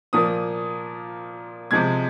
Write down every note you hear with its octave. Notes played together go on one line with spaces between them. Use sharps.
A#2 F3 A#3 D#6
C3 F3 G#3 G#6